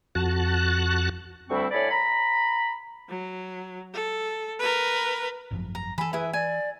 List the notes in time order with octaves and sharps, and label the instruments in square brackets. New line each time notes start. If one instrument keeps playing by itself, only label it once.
[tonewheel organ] F2 F#4 A5 F#6
[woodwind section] D2 G3 C4 E4 C#6
A2 C#5 D5 G#5 B5
A#5 B5
[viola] F#3
A4
A#4 B4
[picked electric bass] G#1 F#2 F3
[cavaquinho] A#5
[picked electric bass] E3 [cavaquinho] A4 B5 [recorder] G#5
[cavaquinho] E4 G#4 E5 [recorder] B4
[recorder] D5 [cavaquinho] G#5